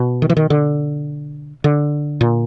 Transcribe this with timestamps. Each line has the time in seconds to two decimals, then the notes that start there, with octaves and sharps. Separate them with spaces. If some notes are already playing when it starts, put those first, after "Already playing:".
Already playing: B2
0.22 D#3
0.30 E3
0.37 D#3
0.50 D3
1.64 D3
2.21 A#2